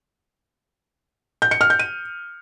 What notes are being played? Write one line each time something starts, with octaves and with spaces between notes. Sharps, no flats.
G6
C#7
F6
G6
D#7